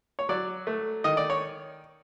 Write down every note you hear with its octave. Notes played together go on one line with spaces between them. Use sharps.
C#5
F#3 D5
A3
D#3 D#5
D5
C#5